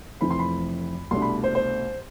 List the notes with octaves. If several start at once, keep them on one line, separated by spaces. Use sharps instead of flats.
F1 F2 E3 A3 C4 B5
C6
B5
C2 B2 A3 D4 C6
B5
C5
C5